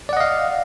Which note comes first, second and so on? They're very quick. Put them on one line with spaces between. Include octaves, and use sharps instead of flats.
D5 F#5 D#5 F5